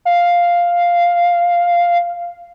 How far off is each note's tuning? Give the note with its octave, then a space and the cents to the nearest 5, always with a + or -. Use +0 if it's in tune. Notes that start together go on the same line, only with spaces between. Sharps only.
F5 +0